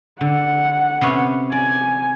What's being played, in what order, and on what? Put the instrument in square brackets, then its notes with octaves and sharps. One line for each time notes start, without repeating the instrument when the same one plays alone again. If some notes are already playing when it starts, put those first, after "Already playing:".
[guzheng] D3 [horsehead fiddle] F#5
[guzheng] C3 B3 C#4
[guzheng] D5 [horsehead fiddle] G#5